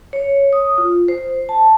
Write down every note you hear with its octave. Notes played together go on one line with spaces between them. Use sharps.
C#5
D#6
F4
C5
A5